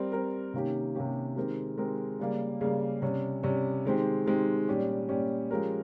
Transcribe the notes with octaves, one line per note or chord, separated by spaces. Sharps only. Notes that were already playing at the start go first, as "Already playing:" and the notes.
Already playing: G3 C4 G4 A#4
G3 C4 G4 A#4
C3 D#3 A#3 C#4 G4
C3 D#3 A#3 C#4 G4
D#3 G#3 C4 G4 A#4
D#3 G#3 C4 G4 A#4
C#3 G3 A#3
C#3 G3 A#3
C3 G3 C#4
C3 G3 C#4
D#3 G#3 C4 G4
D#3 G#3 C4 G4
A#2 G3 C#4 G4
A#2 G3 C#4 G4
F3 G#3 C#4 G4 A#4